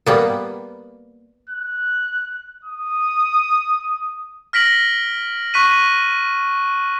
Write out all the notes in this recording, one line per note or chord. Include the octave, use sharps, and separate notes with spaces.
G3 A#3 B3
F#6
D#6
F6 A#6 B6 D7 F#7
C#6 F#6 B6 D#7